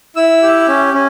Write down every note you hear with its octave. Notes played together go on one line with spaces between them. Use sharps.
E4 E6
G4
C#4
C#4